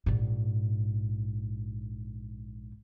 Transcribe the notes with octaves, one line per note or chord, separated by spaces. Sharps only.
A#1 G#2